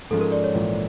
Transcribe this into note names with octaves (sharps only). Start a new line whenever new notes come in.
G#2 F3 G#3 C#4 A4
A#4
D5
C#5
A#1 G#2 E3